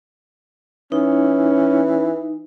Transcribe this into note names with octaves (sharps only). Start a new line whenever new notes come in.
E3 C#4 D#4